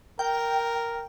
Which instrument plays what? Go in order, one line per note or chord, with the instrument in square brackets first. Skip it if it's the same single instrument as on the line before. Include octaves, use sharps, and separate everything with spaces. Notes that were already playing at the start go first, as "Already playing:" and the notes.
[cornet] A#4 [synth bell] G5